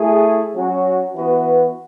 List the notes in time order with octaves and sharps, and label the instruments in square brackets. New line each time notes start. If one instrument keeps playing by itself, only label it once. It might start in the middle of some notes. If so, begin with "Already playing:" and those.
Already playing: [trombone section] A3 E4 G#4
F#3 C#4 F#4
E3 B3 F#4 B4